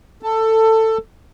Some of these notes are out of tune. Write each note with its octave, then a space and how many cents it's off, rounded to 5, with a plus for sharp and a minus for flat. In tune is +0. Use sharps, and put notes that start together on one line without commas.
A4 +15